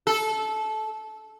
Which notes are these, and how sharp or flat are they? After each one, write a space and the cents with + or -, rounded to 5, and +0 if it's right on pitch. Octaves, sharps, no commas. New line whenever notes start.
A4 -20